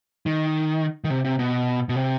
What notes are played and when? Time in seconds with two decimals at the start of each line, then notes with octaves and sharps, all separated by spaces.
0.26 D#3
1.04 D#3
1.10 C3
1.24 C3
1.39 B2
1.89 B2
1.95 C3